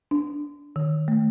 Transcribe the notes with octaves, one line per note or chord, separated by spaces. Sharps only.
D4
D#3
A3